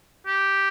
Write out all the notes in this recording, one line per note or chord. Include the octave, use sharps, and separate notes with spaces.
G4